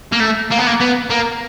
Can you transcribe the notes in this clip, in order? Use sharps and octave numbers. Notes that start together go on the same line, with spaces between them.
A#3
A3
A#3
B3
A#3
B3
A#3